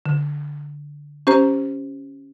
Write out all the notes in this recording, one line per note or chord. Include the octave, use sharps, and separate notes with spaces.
D3
C#4 G4 C5 A#5